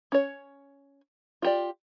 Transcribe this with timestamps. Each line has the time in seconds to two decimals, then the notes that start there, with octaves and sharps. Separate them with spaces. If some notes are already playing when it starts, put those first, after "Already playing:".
0.12 C#4 C#5
1.42 F4 G4 D5